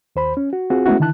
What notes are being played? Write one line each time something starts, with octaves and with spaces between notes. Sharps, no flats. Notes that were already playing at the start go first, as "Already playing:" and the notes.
D#2 C5 B5
C#4
F#4
C4 F4 F#4 G#4
G#3 A3 B3 C#4 E4 F#4
D3 D#3 E4 A5 F#6